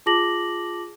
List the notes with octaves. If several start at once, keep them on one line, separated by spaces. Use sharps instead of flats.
F4 G#4 A5 D6 A#6 F#7